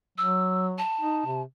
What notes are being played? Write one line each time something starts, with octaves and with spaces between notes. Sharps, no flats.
F#3 E6
A5
D#4
C3